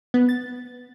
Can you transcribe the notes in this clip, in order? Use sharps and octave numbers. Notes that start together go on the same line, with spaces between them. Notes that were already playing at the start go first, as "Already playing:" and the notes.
B3
A6